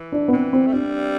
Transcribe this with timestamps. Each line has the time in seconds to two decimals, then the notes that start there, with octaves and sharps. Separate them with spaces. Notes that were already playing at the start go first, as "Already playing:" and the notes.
Already playing: E3
0.12 D4
0.28 B3
0.33 E3 C4
0.53 C4
0.67 A3
0.73 G3 D4